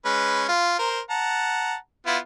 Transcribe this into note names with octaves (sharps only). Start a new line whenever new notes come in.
G#3 C#4 B4
F4
A#4 C5
F#5 A5 A#5
B3 E4 F4